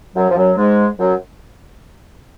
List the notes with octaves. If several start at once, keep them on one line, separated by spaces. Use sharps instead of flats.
F#2 F#3
F3
F#2 F#3
G#2 G#3
F#2 F#3